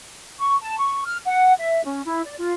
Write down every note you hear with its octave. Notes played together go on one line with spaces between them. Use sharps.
C#6
A5
C#6
F6
F#5
E5
C#4
E4
D5
F4